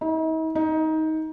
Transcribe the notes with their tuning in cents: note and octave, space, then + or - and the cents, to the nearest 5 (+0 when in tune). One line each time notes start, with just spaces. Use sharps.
D#4 +45
D#4 +20